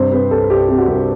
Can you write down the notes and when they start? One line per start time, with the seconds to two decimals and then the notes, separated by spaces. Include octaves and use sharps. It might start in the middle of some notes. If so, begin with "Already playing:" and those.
Already playing: G2 C3 C5
0.12 C3 B4
0.31 C2 A4
0.50 C2 G4
0.69 C3
0.78 F#4
0.87 C2